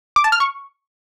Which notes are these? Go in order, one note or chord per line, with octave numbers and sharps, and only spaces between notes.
D6
A5
F6
C#6